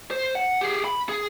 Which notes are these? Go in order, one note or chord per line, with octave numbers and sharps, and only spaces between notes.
C5
F#5
G4 G#4
B5
G#4